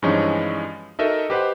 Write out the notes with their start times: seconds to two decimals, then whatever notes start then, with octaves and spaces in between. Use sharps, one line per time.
0.02 G2 E3 F3 G#3 C#4 D#4
0.99 D#4 F#4 A4 A#4 D#5 E5
1.30 G4 B4 C5 D#5 F#5